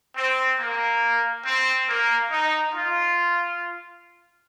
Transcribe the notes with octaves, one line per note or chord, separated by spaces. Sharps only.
C4
A#3
C4
A#3
D#4
F4